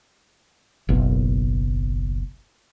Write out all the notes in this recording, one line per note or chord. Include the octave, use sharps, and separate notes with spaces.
F#1 B1